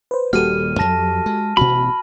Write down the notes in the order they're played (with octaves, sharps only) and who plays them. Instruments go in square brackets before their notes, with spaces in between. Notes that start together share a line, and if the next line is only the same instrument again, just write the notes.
[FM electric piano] B4 C5
[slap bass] D#1 G3 A#3 [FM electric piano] F#4 G4 A4 [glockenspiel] F6 D#7
[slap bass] F2 F#3 [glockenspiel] A5 A#6
[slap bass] G#3
[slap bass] A1 B2 [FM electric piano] F#4 [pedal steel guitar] B5